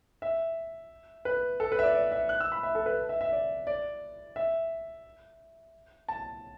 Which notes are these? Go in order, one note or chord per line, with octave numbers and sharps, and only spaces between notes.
E5
B4
A4
B4
E5
D5
D5
E5
F#6
E6
B5
E5
A4
B4
E5
E5
D5
D5
E5
A5